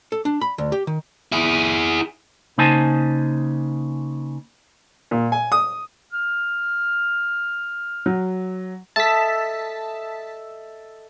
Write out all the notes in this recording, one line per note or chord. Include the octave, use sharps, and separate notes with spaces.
A4
D4
B5
D2
G4
D#3
E4 G#4
C#3 A#3 D#4 C5 G#5 A5
A#2
G#5
D#6
F6
F#3
A4 D#5 E5 A5 B6